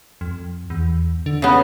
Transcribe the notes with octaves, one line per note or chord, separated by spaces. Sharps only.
F2
E2
D3
C#3 B3